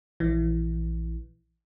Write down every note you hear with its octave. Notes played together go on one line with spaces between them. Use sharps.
A#1 E3